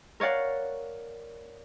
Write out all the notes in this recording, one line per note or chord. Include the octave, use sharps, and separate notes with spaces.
A#4 C#5 D5 F5 F#5